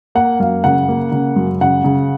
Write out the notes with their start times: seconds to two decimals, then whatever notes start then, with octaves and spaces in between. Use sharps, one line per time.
0.15 A#3 F#5
0.39 F#2 F5
0.64 C#3 F#5
0.89 A#3
1.12 C#3
1.36 F#2
1.61 C#3 F#5
1.84 C#3